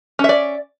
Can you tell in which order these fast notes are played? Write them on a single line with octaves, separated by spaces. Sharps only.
C#4 E5 D5